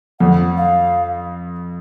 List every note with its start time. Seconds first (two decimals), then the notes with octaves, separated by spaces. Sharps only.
0.20 F2 F#5
0.57 F5